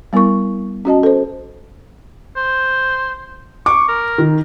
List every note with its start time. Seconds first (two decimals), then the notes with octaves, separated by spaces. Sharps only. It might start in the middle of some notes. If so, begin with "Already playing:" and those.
0.13 G3 B3 E4 A#4 C#6
0.85 C#4 F#4 D#5 A5
1.03 A4 C5
2.37 C5
3.66 C#6 D6
3.89 A#4
4.18 D#3